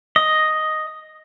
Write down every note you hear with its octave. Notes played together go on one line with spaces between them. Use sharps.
D#5